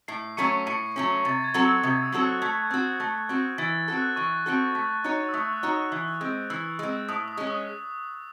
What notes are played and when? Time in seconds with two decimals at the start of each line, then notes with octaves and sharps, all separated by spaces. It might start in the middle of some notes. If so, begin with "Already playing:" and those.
0.08 A2 C7
0.37 F#3 A3 C#4 C#6 C#7
0.66 A2 C#6 C#7
0.96 F#3 A3 C#4
1.25 C3 A6
1.44 G#6
1.54 F#3 C4 F#4 A4
1.64 G#6
1.83 C3 D#6
2.03 E6
2.12 F#3 C4 F#4 A4
2.23 F#6
2.42 A3 G#6
2.70 C4 F#4
3.00 A3
3.29 C4 F#4
3.58 E3 A6
3.88 C4 F#4 A4
3.97 F#6
4.16 E3 C#6
4.46 C4 F#4 A4
4.75 A3
5.04 D#4 F#4 C#5
5.29 E6
5.33 A3 D#6
5.53 F#6
5.63 D#4 F#4 C#5 E6
5.72 D#6
5.92 E3
6.21 G#3 C4
6.50 E3 E6
6.79 G#3 C4
7.08 A2 D#6
7.28 D#6
7.37 G#3 C#4
7.47 D#6